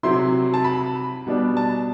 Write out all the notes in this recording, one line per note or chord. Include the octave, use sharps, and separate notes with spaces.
C3 F#3 C4 E4 C6
A5
B5
B2 G3 D4
A5